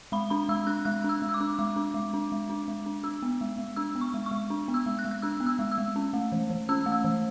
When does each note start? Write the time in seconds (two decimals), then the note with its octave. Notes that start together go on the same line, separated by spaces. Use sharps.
0.12 G#3 B5
0.30 D4 B5
0.49 G#3 E6
0.67 D4 F#6
0.85 G#3 F#6
1.04 D4 E6
1.22 G#3
1.29 E6
1.34 D6
1.41 D4
1.59 G#3 D6
1.76 D4
1.94 G#3
2.14 D4
2.32 G#3
2.50 D4
2.68 G#3
2.86 D4
3.04 D4 E6
3.23 B3
3.41 G#3
3.58 G#3
3.76 D4 E6
3.95 B3
4.01 C#6
4.14 G#3
4.26 C#6
4.31 G#3
4.50 D4
4.68 B3
4.74 E6
4.86 G#3
4.99 F#6
5.05 G#3
5.11 F#6
5.22 D4 E6
5.40 B3
5.47 E6
5.59 G#3
5.72 E6
5.78 G#3
5.96 C#4
6.13 A3
6.32 E3
6.50 E3
6.69 C#4 E6
6.86 A3
6.92 E6
7.04 E3